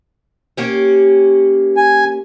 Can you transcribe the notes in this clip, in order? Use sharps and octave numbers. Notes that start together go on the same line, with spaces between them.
A#3 C#4 G4
G#5